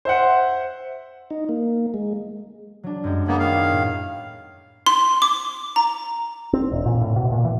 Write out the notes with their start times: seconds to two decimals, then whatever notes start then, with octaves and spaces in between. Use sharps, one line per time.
0.05 C5 E5 F#5
1.31 D#4
1.49 A#3
1.94 G#3
2.83 F#3 D4
3.04 F#2 G3 G#3
3.28 C#3 A#3 B3 B5 D#6 G#6
3.40 D#3 F5
3.72 A2
4.86 C6
5.22 D6
5.76 A#5
6.53 C4
6.72 E1
6.86 A#2
7.01 A2
7.16 B2
7.31 A#2
7.45 E3